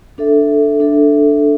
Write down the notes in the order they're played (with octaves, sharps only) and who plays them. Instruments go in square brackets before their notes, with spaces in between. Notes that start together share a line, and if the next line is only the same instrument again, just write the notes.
[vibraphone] D4 A4 E5
D4 A4 E5